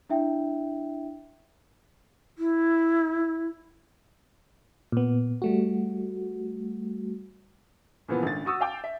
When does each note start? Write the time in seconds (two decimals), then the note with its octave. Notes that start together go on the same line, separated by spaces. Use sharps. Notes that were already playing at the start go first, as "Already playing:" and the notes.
0.10 D4 E4 E5 G5
2.38 E4
4.92 A#2 B3
5.42 G3 A3 F#4
8.08 A#2 C#3 E3 F3 A#3 B3
8.23 G#1 D3 C#4 A6
8.45 F#4 C#6 D#6 E6
8.61 F5 G5 D6
8.84 E5